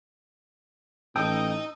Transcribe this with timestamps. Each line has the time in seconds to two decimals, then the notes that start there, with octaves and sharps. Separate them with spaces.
1.16 A1 D#4 D#5 G5 A5 D#6 E6